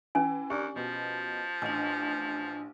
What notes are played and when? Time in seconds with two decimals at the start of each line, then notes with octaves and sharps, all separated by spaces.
0.15 E3 C#4 G#5
0.50 D#2 D4 G4
0.76 B2 F3
1.62 A1 D4 G#5